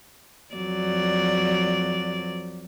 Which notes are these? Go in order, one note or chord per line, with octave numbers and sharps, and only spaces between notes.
F2 F#3 D5